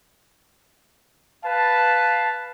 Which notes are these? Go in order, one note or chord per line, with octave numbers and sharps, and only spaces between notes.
B4 F5 A5